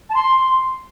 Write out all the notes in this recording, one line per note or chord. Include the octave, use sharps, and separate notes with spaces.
A5
C6